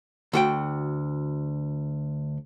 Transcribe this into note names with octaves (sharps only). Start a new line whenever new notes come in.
D2 F#4 G5